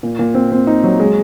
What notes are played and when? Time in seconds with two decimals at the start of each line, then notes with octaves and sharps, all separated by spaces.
0.03 A#2
0.19 A#2
0.35 C4
0.52 C4
0.67 D#4
0.84 F#3
1.00 G#3